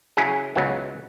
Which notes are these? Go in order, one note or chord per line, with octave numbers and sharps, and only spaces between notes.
C#3 F#3 C#4 E4 G#4
C#2 C#3 F#3 B3 E4